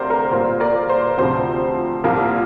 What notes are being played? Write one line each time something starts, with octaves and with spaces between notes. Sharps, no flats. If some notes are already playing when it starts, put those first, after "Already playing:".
Already playing: D2 C3 A#3 A#4 C5 D5
A#4
A#2 G3 A#3 C5
A#4 D5
C5
D2 C3 F3 C5
C2 A#2 F3 A#3